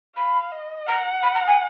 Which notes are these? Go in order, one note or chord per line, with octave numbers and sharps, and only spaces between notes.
F5 B5
D#5
F#5 A#5
B5
A#5
G#5